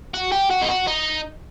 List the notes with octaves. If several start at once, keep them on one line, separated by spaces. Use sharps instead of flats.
F#4
G4
F#4
D#4
F#4
D#4